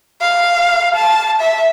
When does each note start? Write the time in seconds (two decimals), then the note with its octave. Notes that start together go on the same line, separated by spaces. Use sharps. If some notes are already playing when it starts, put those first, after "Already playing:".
0.21 F5
0.95 A5
1.41 E5